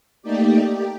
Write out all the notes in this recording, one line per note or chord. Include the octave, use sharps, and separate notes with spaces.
A3 A#3 D#4 G4 D5
G4